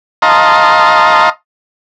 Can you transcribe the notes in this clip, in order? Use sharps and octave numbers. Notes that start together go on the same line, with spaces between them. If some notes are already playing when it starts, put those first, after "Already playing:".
D#5 F5 A5 A#5 C6